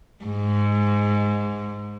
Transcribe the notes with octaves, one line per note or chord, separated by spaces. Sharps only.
G#2